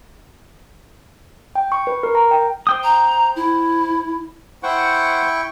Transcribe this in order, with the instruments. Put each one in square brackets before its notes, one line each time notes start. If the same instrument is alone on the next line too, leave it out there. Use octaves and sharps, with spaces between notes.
[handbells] G5
C#6
B4
A#4
A#5
G5
[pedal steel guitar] C5 G5 D#6
[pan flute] A#5
E4
[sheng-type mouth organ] E4 G5 C#6 [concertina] C5 F#5